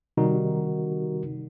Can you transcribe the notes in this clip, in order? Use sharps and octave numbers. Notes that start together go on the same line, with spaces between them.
C3 D#3 G3 D#4 F#4 A#4